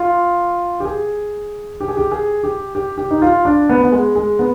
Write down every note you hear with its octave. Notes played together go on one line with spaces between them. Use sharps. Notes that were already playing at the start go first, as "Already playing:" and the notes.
Already playing: F4
G4
G#4
G4
G#4
G4
G#4
G4
G4
G4
D#4
F4
D4
B3
B3
G#3
G#3
B3